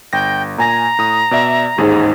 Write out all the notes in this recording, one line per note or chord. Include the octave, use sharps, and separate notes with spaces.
G1 G5 A#6
A#2 G#5 A#5 A#6
A2 D#6
B2 D5 E5
A1 D#2 G#2 G#4